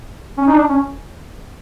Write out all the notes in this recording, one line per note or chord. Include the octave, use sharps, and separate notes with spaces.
C#4
D#4
D4
C#4